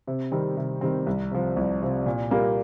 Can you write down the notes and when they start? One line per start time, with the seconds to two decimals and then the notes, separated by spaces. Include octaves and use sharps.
0.07 C3
0.32 D#3 G3 C4
0.57 C3
0.81 D#3 G3 C4
1.06 C2
1.31 C3 F3
1.56 C2
1.82 C3 F3
2.06 A#2
2.31 G3 A#3 F4